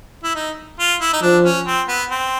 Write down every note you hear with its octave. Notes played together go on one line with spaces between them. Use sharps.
E4
D#4
F4
E4
D#4
F3 D4
C#4
C4
B3
C4